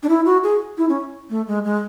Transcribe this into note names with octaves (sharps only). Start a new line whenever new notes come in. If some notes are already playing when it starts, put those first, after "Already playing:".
D4
E4
F#4
G#4
E4
C#4
A3
G#3
G#3